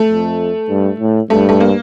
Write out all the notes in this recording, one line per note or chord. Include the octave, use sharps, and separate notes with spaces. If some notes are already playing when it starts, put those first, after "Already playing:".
Already playing: A3
F2
G2
A2
G2 A3
A3
A#3